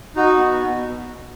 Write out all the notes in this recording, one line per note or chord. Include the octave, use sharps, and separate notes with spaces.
D#4 F#4
B3
B2